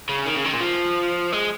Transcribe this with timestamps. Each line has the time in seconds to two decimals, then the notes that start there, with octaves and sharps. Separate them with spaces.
0.09 C#3
0.26 D#3
0.35 C#3
0.45 D#3
0.53 A#2
0.61 F3
1.33 G#3